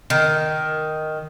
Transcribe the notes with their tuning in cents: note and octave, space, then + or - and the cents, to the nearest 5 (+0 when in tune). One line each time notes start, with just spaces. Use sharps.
D#3 +0